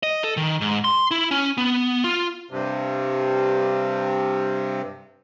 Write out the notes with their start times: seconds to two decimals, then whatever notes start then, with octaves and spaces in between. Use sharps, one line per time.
0.03 D#5
0.24 A4
0.37 D#3
0.61 G#2
0.84 C6
1.11 E4
1.31 C#4
1.57 B3
2.04 F4
2.51 G2 C3